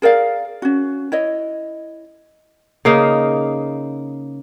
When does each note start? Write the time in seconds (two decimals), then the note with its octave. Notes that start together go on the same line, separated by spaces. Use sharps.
0.02 G#4 A#4 D5 F5
0.62 C#4 F#4
1.12 E4 C#5 D#5
2.85 C#3 A#3 D#4